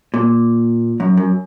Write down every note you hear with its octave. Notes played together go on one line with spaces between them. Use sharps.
A#2
F#2
F#2